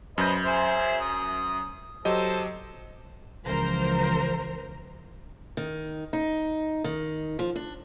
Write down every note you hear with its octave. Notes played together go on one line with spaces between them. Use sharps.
F#2 B4 C5 D#5 G6
G#4 C5 E5
D#6
F#3 G4 A4 C5 D#5
C#2 E3 F3 A#4 C5 A#5
D#3
D#4
D#3
F3
D4